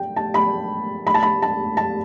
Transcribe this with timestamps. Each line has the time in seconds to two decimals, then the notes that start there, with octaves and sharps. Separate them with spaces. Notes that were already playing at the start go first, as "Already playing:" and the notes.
Already playing: G5
0.16 A5
0.34 B5
1.07 B5
1.14 A5
1.23 B5
1.42 A5
1.77 A5